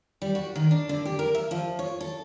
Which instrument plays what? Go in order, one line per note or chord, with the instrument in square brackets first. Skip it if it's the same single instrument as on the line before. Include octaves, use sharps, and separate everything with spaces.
[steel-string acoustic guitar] G3
F#4
D#3
D4
D3
G4
A#4
E5
F3
C#5
A4